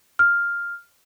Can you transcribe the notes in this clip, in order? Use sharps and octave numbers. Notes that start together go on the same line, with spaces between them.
F6